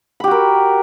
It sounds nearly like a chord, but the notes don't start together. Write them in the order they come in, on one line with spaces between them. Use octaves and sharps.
B5 G4 F#4 A#4